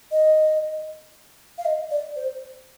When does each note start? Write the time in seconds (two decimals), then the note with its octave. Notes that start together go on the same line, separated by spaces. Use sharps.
0.12 D#5
1.58 F5
1.65 D#5
1.91 D5
2.16 C5